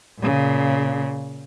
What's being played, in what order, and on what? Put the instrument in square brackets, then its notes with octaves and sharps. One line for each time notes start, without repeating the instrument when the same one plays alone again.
[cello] A#2 C#3